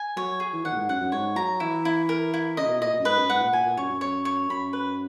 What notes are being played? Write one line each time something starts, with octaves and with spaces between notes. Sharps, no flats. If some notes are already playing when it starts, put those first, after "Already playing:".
Already playing: G#5
F#3 C#5
G#4
E3
D#3 F#5
A#2
G#2
F#2 F#5
F#2
G#2 C#5
F#3 A#5
E3 E4
E4
A#4
E4
C#3 D#5
A#2
B2
A#2 D#5
A#2
F#2
G#2 B4
F#2
G#2 F#5
A#2
A#2 G#5
A#2
F#2 C#5
F#2
C#5
C#5
F#2 B5
B4